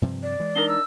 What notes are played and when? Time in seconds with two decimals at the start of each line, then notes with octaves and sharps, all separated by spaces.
0.02 G2 C3 F3
0.23 D5
0.40 E3 G#3
0.55 D4 D#4 A#4 G7
0.69 E6